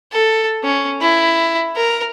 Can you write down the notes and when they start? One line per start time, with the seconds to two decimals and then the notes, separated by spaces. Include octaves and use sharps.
0.12 A4
0.63 C#4
1.01 E4
1.76 A#4